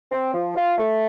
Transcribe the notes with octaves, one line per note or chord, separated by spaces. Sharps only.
C4
F3
F4
A3